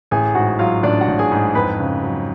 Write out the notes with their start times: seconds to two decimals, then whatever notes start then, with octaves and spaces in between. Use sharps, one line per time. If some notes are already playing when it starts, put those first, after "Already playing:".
0.11 A1 G#4 G#5
0.35 G#2 F#4 F#5
0.59 F#3 F4 F5
0.83 A1 D4 D5
1.01 F#4 F#5
1.08 A1
1.19 G#4 G#5
1.32 G#2
1.55 F2 B4 B5
1.79 C#3
2.03 F#3